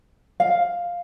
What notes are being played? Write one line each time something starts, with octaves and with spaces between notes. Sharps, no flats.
F5